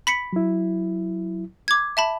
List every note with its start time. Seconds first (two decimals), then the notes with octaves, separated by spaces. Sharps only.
0.07 B5 B6 C#7
0.33 F#3 E4
1.68 D6 G#6
1.97 E5 A5 B5